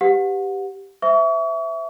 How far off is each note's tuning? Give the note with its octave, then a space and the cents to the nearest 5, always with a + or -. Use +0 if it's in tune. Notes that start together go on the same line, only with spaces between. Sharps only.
G4 +0 B4 +20 F#5 -30
C5 -30 E5 +0 C#6 +40